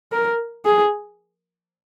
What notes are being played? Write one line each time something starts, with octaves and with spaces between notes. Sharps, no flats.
A#4
G#4